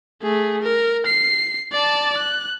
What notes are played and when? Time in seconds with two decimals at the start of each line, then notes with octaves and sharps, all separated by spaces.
0.23 A3 G#4
0.62 A#4
1.07 C7
1.73 D5 A5
2.18 F#6